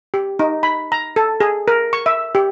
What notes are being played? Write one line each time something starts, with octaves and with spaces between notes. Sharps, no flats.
G4
D#4
B5
A#5
A4
G#4
A#4
C#6
E5
G4